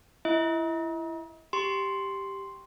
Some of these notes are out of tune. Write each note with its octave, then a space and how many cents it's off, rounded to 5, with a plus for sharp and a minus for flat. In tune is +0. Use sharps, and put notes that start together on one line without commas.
E4 +20 D#5 +45
G4 +0 C6 +0